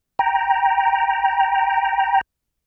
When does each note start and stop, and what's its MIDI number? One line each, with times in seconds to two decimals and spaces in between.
0.19 2.21 79
0.19 2.21 82